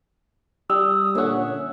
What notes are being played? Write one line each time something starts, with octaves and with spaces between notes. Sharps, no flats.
G3 D#6 E6
A#2 D3 C#4 C#5 E5 F#5